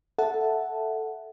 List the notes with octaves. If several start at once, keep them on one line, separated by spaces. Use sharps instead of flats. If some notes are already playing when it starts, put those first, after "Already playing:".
A4 E5 F#5 A5